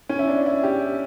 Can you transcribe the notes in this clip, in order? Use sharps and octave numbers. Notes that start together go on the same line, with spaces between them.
C#4
E4
D4
E4
G4